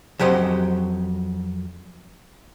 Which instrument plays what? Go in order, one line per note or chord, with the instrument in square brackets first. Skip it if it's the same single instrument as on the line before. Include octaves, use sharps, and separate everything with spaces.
[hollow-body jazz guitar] F2 F#3 G4 C5 D#5